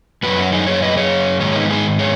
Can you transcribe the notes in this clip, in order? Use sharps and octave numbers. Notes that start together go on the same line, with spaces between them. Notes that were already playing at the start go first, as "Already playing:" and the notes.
F#2 F#3 F#4 B4
C#4 F#4
D#4 G#4
G#4 C#5
B4 D#5
G#4 C#5
G#2 D#3 G#3 G#4 C#5
B3 D#4
D#4 G#4
G#4 C#5